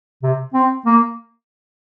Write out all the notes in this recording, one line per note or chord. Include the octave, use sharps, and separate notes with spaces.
C3
C4
A#3